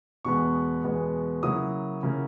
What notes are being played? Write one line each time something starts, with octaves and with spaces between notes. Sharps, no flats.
E2 B2 G#3 B3 C#6
E2 B2 G#3 B3
C#3 F#3 A#3 E4 D#6
C#3 F#3 A#3 E4